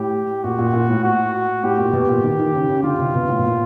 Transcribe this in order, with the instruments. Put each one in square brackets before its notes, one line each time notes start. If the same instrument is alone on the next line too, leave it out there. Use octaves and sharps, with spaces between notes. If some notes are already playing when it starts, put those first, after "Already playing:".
Already playing: [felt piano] A2 [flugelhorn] G4
[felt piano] A#2 [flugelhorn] F#4
[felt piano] A#2
A#2
A2
[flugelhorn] F#4
[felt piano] A2 [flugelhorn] G4
[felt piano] A#2
B2
A#2
D#3
D#3
C#3
C#3
[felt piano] D3 [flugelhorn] F4
[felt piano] C3
B2
A2
B2
A#2